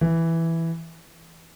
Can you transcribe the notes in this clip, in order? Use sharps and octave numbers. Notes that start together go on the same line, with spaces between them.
E3